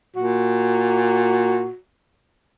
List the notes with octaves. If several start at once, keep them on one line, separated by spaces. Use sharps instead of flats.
A#2 F#4